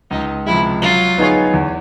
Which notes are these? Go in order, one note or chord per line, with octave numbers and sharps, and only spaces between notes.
C#2 D#4
C3 F3 G#3 E4
F#3 F4
B3 D#4 G#4 C#5
E2